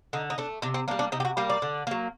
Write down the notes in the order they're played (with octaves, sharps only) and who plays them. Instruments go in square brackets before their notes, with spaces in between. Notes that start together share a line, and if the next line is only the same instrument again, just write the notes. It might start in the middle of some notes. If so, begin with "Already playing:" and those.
[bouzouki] D3 D#4
D#4
A3 D4
C3 D4
C4
A#3 D4
G3
D4
C3 D#4
G4
F#4
G3 A#3 G4
D5
D3
F#3 A#3